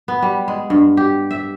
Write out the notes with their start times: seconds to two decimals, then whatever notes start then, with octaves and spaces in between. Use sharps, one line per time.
0.08 B3
0.22 G3
0.48 G#3
0.70 G2
0.97 G4
1.31 E5